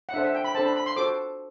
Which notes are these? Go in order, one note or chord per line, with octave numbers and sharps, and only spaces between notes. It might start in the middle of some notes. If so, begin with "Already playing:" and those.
F#5
D4 A4 C5 E5
E5
G5
B5
D4 A4 C5 A5
B5
B5
C6
F#4 A4 C5 D6